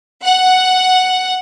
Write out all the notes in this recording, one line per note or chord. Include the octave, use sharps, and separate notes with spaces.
F#5